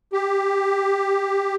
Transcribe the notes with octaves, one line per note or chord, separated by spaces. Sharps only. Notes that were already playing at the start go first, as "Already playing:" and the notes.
G4